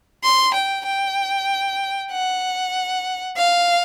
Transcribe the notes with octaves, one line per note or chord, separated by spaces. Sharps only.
C6
G5
G5
F#5
F5